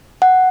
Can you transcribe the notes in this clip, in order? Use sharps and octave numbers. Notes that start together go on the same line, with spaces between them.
F#5